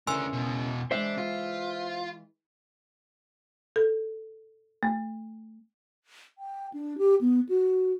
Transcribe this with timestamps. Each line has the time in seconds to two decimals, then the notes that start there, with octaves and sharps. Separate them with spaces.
0.07 D2 C#3 E3 D4 A#4 G#5 C6 E6
0.33 E2 B2
0.91 E3 G#3 D4 C5 E5
1.18 F4
3.76 A4
4.83 A3
6.38 G5
6.74 D4
6.98 G4
7.21 B3
7.49 F#4